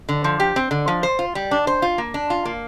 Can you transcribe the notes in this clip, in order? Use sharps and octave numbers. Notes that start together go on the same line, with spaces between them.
D3
F3
G4
C4
D3
F3
C5
F4
G3
D4
C5
F4
A#3
D4
F4
A#3